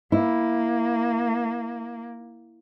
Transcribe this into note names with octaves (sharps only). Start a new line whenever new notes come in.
A#3 E4